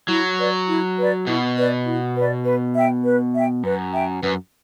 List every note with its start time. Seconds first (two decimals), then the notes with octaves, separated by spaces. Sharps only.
0.08 F#3 E4
0.38 B4 D5
0.68 E4
0.98 B4 D5
1.27 B2 E4
1.56 B4 D5
1.86 E4
2.16 B4 D5
2.46 B4
2.75 E5 G5
3.04 B4
3.34 E5 G5
3.63 F#2 B4
3.93 E5 G5
4.23 F#2 B4